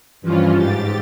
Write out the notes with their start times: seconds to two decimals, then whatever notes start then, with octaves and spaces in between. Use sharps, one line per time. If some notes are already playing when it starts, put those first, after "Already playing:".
0.22 G2 E3 F3 C#4 F4
0.57 G#2 G4 A6